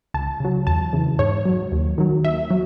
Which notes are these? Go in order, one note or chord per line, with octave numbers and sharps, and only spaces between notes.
C#2 A5
C#3 F#3
E2 A5
C#3 E3
G#2 C#5
F#3
D#2
D#3 F#3
D#2 E5
F#3